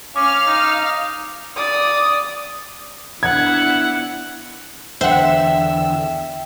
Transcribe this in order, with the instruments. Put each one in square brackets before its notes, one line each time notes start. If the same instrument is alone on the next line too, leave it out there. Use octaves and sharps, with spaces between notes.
[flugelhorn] C#4 [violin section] F5 F6 [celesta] D6
[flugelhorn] D#4
[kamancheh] D5 D#6
[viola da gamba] B3 D4 E4 [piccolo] F#5 [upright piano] G#6
[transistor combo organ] E2 D3 E6 [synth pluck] C5 F#5 [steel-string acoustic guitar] E5 [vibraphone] G5